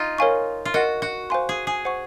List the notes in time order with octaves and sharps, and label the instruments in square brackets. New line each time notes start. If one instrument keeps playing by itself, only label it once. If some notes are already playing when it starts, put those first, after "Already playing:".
Already playing: [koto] D#4 F4
[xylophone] A#4 C#5 F5 G#5 C#6
[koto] F4
[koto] F#4 [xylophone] A#4 D#5 F#5
[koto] F#4
[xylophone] C5 F5 G#5 C6
[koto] G#4
G#4
[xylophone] C5 F#5 C#6